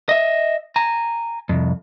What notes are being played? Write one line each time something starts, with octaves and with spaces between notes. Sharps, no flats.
D#5 E5
G#5 A#5
C2 F2